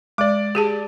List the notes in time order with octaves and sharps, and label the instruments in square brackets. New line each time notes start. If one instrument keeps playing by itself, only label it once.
[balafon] G#3 [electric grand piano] D5 D6
[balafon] G4 G#4 A5